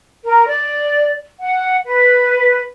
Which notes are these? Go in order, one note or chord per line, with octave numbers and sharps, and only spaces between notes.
A#4
D5
F#5
B4